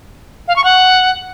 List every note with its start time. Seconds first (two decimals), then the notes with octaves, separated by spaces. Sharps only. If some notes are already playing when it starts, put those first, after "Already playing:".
0.48 F5
0.56 C#6
0.64 F#5